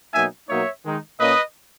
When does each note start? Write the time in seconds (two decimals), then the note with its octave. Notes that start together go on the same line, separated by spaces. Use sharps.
0.13 B2 F#3 A#3 D#4 E5 G#5
0.48 B2 F#3 A#3 D#4 C#5 E5
0.84 D#3 G#3 D#4
1.20 A#2 A#3 C#4 B4 D#5